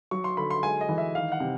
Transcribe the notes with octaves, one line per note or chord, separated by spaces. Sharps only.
F#3 C#6
C6
D3 B5
C6
G#3 G#5
D#5
E3
E5
D#3 F5
F#5
C3